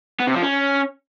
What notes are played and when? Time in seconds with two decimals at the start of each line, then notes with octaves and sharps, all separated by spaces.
0.20 B3
0.27 C3
0.35 F3
0.43 C#4